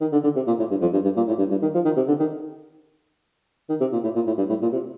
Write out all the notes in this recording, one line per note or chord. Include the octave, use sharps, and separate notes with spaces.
D#3
D3
D3
C3
A#2
A2
G2
F2
G2
G2
A#2
A2
G2
G2
D#3
F3
D#3
C3
D3
D#3
D#3
C3
A#2
A2
A#2
A2
G2
A2
A#2
C3